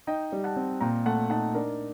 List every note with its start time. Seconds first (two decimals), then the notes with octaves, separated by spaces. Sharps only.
0.07 D#4 D#5 G5
0.32 G3
0.44 F#5 A5
0.56 C4
0.81 A#2 G5 A#5
1.06 A3 F#5 A5
1.30 D#4 F#5 A5
1.54 D4 A#4